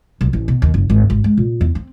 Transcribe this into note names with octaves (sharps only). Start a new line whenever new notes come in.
B1
A1
B2
D#2
F#1
G#1
G#1
G#3
A#2
E2
C4